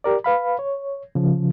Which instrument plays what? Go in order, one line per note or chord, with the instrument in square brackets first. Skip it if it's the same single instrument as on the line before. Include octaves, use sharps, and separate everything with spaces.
[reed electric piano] G4 A#4 D5
B4 F5 B5
C#5
C#3 F3